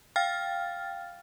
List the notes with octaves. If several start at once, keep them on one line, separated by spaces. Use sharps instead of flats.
F5 G5 F6 A6